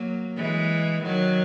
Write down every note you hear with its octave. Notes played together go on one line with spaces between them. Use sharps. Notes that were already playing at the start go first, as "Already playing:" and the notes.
Already playing: F#3 A#3
E3 G#3
D#3 F#3